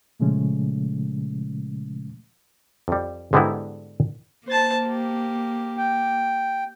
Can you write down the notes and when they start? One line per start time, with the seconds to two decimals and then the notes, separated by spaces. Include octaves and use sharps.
0.20 A#2 C#3 F3 G#3 A3 C#4
2.88 F2 G3
3.33 G#2 D3 G3 B3 D#4 E4
4.47 A#3 C5 A5
4.86 G4
5.77 G5